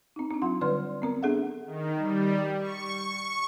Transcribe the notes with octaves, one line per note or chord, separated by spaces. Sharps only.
C4 D#4
C4 D4
F#3 F4 F#5 C6
D3 G3 B4 D5 C6 F6
B3 C4 A#4
B3 D4 G#4 A4 E5 F#5
D#3
G3
C#6
C#6